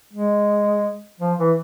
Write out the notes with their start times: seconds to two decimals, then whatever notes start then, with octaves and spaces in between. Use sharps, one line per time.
0.13 G#3
1.20 F3
1.38 E3